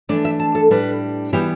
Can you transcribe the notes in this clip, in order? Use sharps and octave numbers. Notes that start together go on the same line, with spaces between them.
E3 A3 D4 D5
E5
A5
A4
A2 G3 D4 B4
E3 G3 B3 E4 G4